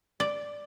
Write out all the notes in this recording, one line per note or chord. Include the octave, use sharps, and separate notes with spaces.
D5